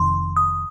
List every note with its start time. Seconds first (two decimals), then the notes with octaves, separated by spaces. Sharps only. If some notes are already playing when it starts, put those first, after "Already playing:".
Already playing: F1 F2 C3 D#3 C6
0.37 D#6